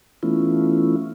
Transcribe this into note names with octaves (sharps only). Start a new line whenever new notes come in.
E3 A3 B3 C#4 E4 F4